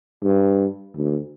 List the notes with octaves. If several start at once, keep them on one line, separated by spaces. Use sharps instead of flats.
G2
D2